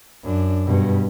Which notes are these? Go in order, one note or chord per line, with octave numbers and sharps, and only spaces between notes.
F#2 D4
G2 B2